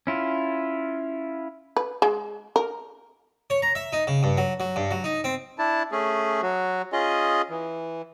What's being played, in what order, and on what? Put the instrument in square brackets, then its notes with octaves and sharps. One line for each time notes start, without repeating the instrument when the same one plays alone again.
[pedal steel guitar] C#4 E4 F4
[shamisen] B4
G#3
A#4
[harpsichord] C#5
A#5
E5
D#4
C#3
G2
F#3
F#3
G2
F#3
D#4
C4
[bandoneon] D4 E4 A5
A3 C#4 G#4
F#3 F#4
C#4 F4 G#4 D#5
E3